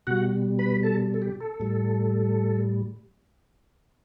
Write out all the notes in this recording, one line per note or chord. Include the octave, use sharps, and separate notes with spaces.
B2 G3 F#4 F#5
B4 B5
A4 A5
A4
G4
A4
A2 G3